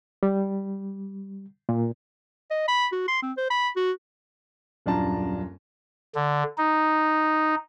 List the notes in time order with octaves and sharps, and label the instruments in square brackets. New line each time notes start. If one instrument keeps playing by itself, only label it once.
[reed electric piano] G3
A#2
[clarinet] D#5
B5
F#4
C6
C4
C5
B5
F#4
[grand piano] D#1 F#2 D4 F4 A5 A#5
[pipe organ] D3
D#4